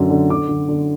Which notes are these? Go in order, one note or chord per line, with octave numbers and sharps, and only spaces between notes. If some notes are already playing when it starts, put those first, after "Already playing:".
Already playing: F#2 D3
D3
D3 D6
D3
D3